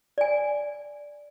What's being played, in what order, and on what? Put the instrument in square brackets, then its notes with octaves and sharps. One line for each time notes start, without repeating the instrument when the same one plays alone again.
[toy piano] D5 G#5